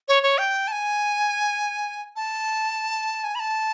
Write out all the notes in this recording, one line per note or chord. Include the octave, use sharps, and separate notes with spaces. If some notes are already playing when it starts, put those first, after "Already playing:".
C#5
C#5
G5
A5
G#5
A5
G#5
B5
A5